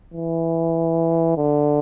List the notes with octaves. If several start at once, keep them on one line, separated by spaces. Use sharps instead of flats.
E3
D3